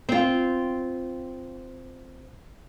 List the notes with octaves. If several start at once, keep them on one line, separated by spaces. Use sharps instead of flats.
C4 F4